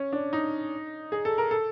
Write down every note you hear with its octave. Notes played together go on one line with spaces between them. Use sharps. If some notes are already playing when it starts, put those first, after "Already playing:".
Already playing: C#4
D4
D#4
G#4
A4
A#4
A4